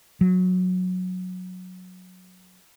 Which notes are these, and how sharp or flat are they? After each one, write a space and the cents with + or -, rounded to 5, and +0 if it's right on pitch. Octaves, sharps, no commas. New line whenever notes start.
F#3 -15